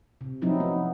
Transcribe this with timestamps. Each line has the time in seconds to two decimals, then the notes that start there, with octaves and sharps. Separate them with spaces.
0.21 C3
0.42 F3 F#3 C4 D#4 E4
0.60 B3